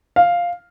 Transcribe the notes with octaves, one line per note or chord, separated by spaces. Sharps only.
F5